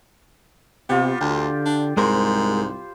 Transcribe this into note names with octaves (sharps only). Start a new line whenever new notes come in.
C3 B3 F4 G4
D2 D3 G5
D4
C2 G#2 G#3 A#4 C5 B5 C6